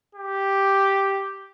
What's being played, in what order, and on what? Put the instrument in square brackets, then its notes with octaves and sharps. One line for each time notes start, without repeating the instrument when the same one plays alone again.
[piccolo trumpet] G4